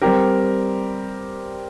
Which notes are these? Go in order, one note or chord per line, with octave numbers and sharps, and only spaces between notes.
G3 C4 G4 A#4